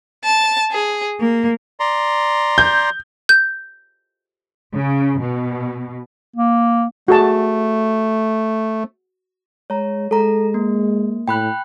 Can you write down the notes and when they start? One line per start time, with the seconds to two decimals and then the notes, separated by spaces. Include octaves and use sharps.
0.24 A5
0.72 G#4
1.21 A#3
1.80 D5 A#5 C6
2.58 G6
3.29 G6
4.73 C#3
5.19 B2
6.36 A#3
7.08 A3 F#4 G#4 A5
9.70 G#3 C#5 A#5
10.11 G#3 A4 A#5
10.54 A#3
11.28 A2 G5 B5 F#6